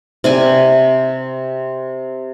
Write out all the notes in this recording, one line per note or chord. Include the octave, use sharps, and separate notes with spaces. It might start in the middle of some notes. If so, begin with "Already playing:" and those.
C3 D5 G#5